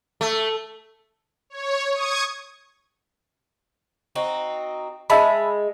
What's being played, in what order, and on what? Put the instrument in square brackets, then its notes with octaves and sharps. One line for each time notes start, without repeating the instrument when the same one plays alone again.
[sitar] A3
[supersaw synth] C#5
C#6 D#6 G#6
[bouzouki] C4 D#4 F#4
[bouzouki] G#3 [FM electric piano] E5 A5 B5